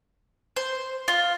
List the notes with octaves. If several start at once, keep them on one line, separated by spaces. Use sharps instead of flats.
C5
F4